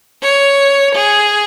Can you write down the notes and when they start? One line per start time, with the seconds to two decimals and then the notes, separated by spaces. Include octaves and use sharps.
0.22 C#5
0.93 G#4